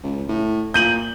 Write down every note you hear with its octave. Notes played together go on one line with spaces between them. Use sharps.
C#2
A2
A#2 G6 D#7 F#7